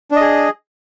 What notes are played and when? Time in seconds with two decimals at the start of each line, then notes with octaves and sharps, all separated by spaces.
0.11 D4
0.16 D#5
0.21 G#4